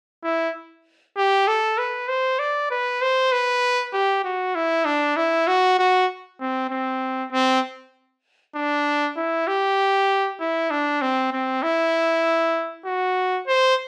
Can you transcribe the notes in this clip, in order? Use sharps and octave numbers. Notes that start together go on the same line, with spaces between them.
E4
G4
A4
B4
C5
D5
B4
C5
B4
G4
F#4
E4
D4
E4
F#4
F#4
C4
C4
C4
D4
E4
G4
E4
D4
C4
C4
E4
F#4
C5